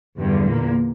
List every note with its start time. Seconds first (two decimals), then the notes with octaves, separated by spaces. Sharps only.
0.19 E2 G2 D3 G3
0.46 A#2 A#3